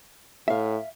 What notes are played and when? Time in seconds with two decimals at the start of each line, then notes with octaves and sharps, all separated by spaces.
0.48 A2 E5 F5